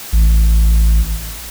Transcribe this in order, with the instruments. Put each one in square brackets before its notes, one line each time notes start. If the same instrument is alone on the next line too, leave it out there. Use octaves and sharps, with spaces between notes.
[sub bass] A1